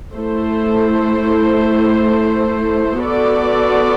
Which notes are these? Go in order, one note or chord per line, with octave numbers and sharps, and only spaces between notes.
A3 E4 A4 C5
B3 F#4 A4 D5